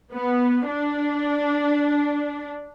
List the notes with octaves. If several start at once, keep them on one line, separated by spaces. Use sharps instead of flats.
B3
D4